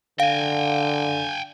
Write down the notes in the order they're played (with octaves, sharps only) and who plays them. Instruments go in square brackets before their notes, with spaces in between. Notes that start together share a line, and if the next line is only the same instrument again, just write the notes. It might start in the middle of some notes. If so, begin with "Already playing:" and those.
[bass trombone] D3 [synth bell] F5 [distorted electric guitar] G5 G#5